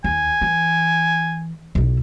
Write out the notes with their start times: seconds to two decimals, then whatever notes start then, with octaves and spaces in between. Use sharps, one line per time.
0.04 D#2 G#5
0.42 E3
1.75 B1 E4